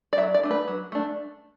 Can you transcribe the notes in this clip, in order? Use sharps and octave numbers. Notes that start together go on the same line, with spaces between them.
D5
F#3 E5
D5
A3 D4
B4
F#3
A3 D4